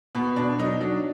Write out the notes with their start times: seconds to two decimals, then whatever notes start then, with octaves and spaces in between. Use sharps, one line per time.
0.15 B2 B3
0.36 B2 D4
0.58 F#3 D#4
0.80 F#3 D4